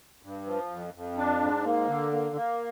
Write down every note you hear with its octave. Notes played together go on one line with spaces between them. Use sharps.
G2
F3
F2
F2
D4
G#2
A#3
D3
A#3
A#3